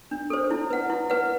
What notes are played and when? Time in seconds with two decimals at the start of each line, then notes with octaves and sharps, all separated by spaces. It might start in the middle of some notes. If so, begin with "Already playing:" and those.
0.11 D4
0.30 A4 C5
0.51 E4
0.70 B4 F#5
0.90 E4
1.10 B4 F#5